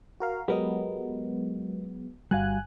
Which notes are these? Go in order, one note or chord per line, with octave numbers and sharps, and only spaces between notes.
F#4 A#4 F5
F#3 G#3 B3 G4 A#4 D#5
G1 G3 F#4 F5 G#5 F#6